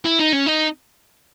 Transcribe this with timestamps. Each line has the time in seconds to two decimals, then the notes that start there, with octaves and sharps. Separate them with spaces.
0.05 E4
0.20 D#4
0.33 C#4
0.46 D#4